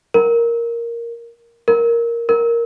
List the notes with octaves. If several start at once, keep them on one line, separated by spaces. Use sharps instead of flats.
A#4
A#4
A#4